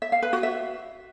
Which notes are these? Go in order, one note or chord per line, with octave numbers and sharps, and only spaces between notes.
E5
F5
B4
F#4
E5